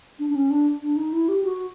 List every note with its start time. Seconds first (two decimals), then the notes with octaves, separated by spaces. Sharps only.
0.19 D4
0.30 D4
0.35 C#4
0.50 D4
0.82 D4
0.97 D#4
1.13 E4
1.28 G4
1.44 F#4